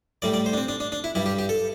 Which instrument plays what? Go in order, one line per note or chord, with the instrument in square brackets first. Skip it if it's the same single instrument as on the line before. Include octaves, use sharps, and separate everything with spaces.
[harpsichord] A2 G3 D5
D5
C5
D4
C4
D4
D4
D4
E4
G2 G3 E4
G4
G4
A4